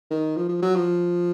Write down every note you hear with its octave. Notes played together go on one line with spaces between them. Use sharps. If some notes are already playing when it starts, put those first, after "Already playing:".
D#3
F3
F3
F#3
F3